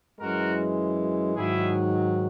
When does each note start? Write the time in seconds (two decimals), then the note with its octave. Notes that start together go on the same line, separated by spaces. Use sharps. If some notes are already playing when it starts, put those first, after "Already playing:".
0.20 F#2 E3 G#3 F#4 A#4
1.37 G#2 D#3 F#3 E4 G#4